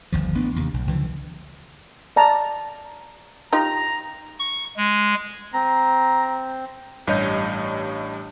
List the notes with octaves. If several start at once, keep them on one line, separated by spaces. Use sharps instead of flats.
G1 D#2 F3
A1 B3 D4
D#2 C3
B1
C#2 D3 E3 F3
D5 A5 A#5
D#4 F4 G4 A#5
C#6
G#3
C4 A#5
A1 G2 G3 C#5 D#5 G6